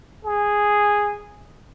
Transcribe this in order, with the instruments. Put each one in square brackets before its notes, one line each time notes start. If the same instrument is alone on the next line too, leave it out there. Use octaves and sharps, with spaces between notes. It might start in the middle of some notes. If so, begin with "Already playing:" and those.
[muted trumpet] G#4